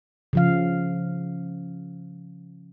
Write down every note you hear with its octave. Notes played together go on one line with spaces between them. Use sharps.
C#3 F3 F5